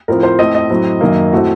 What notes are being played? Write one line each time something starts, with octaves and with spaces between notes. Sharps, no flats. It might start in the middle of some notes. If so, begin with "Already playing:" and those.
A2 F3 C4 A#4
C5
A2 A3 C4 D#5
D#5
A2 F#3 C4
F#2 D#3 A#3
A2 A3 C4 F#4